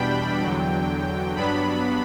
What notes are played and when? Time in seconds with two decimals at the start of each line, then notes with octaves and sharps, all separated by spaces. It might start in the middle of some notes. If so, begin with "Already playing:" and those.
Already playing: E2 B2 G3 D4 G5 B5
0.41 E2 D3 F#3
1.36 G2 F#3 B3 D4 B5